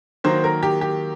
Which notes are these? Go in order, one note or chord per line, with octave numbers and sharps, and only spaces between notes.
D#3 F#3 A#3 C5
A#4
G4
G4